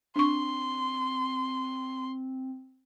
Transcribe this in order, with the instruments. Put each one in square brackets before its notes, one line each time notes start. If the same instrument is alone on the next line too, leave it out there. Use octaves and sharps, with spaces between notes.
[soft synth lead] C4 [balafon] D4 C#6 [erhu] C6